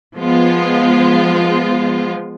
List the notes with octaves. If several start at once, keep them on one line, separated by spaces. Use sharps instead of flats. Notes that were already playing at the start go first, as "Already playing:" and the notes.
F3 G#3 B3 F4